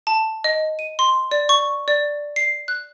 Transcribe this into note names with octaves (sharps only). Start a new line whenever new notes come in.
A5
D#5
D#7
C6
D5
C#6
D5
C7
F#6